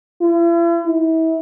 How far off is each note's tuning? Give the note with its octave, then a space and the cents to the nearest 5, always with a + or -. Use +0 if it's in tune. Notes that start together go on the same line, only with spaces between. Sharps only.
E4 +45
E4 -35